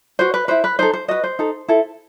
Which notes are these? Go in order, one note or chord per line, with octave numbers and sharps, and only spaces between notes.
F#4 B4 C5
B4
E4 B4 C5
B4
D#4 A4 C5
C5
F#4 B4 D#5
C5
D#4 A4
E4 A4